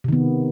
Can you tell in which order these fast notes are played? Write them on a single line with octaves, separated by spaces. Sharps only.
C3 D#3 B3